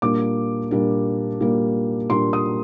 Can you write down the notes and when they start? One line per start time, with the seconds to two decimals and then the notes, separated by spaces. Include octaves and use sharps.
0.02 A#2 G3 A#3 D4 D6
0.71 A#2 G3 A#3 D4
1.40 A#2 G3 A#3 D4
2.10 A#2 G3 A#3 D4 C6
2.33 D#6